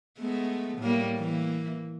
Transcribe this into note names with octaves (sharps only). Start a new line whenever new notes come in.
G#3 A3 B3
A2 G3 A#3
E3 A#3